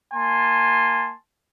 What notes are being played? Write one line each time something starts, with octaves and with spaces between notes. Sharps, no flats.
A#3 G#5 A5 C6